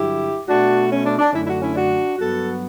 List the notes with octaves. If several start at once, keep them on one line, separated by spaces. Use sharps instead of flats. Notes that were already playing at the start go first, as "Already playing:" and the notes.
Already playing: G2 D3 F#3 E4 G4
B2 A3 D4 F#4
C#4
D4
D4
F#2 D3 A3 C#4 E4
E4
D4 F#4
C#4 E4
D4 F#4
G2 F#3 B3 F#4 A4